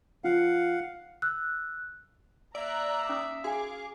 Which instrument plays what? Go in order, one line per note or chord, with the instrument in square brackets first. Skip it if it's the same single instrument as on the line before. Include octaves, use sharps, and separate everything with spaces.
[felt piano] F3 [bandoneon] F5 F#5
[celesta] E6 F#6
[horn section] A#3 E5 [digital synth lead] D5 [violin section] A#5 F#6
[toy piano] C#4 D#6 E6
[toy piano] F#4 G#5 [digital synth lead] G#4 [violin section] F5 D6